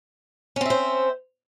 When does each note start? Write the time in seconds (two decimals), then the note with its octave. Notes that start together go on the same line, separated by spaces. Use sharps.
0.56 C#4
0.61 C4
0.65 E5
0.70 C5